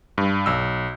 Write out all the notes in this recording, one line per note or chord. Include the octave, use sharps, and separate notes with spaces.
G2
B1 E6